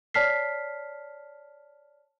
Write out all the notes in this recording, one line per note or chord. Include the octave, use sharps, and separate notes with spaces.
C#5 D5 A5 F6 B6 C7